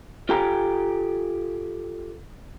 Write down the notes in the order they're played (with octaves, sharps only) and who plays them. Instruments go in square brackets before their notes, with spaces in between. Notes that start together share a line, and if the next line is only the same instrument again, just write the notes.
[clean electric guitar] F4 G4 A4 G5 G#5 A#5